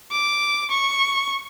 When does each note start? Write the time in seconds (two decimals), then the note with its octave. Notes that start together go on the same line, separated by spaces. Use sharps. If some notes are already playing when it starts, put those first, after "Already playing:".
0.11 D6
0.71 C#6